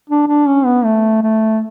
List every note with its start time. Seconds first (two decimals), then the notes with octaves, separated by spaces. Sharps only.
0.10 D4
0.28 D4
0.48 C#4
0.65 B3
0.85 A3
1.22 A3